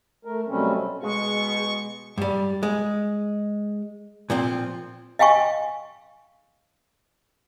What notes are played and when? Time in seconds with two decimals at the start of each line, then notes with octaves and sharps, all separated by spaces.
0.25 A3 A#4
0.48 B2 F#3 G3 A3 C4 C#4
1.03 B2 G#3 G#4 C#6
2.18 G2 G3
2.63 G#3
4.30 A#2 F3 C4
5.19 D#5 F5 G5 G#5 C#6